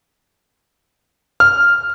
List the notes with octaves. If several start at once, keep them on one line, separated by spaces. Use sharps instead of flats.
F6